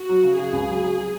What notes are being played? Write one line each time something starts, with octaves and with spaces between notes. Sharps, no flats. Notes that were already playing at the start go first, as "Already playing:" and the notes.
Already playing: F#4
F#3
C#3
C#3 G#4
C#2
F#3
F#3
F#3